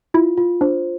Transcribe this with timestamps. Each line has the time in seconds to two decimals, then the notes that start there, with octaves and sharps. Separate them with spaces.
0.14 E4 F4
0.38 F4
0.61 D4 C5